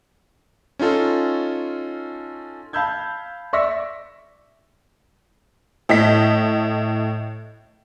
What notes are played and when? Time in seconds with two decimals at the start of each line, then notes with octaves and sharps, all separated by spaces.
0.79 C#4 D#4 F4 A4
2.73 F5 A5 B5 E6 G6 G#6
3.53 D5 E5 C#6 E6 A#6 B6
5.89 A2 D#5 B6